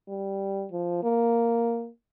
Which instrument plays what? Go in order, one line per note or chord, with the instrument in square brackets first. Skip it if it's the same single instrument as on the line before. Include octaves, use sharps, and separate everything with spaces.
[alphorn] G3
F3
A#3